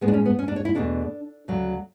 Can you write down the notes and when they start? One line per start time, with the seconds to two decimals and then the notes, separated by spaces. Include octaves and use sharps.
0.01 A2 G#3 B3
0.08 D4
0.13 C#4
0.25 B3
0.39 C#4
0.48 D4
0.56 C#5
0.65 E4
0.75 E2 B2 A3 D4
1.48 D2 C#3 F#3